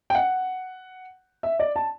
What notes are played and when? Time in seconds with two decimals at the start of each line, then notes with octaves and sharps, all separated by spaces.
0.10 G5
0.15 F#5
1.43 E5
1.59 D5
1.76 A5